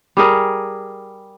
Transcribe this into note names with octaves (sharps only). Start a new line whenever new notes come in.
G3 G#4 A#4